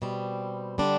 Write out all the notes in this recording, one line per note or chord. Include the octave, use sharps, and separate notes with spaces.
B2 G3 C4
D3 G3 D4